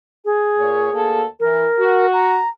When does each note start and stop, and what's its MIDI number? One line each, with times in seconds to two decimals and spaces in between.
0.25 1.20 68
0.58 0.88 46
0.58 0.88 73
0.93 1.23 38
0.93 1.23 58
0.93 1.23 69
1.40 1.64 52
1.40 2.06 70
1.78 2.37 66
2.13 2.48 82